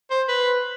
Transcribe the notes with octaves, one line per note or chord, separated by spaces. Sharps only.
C5
B4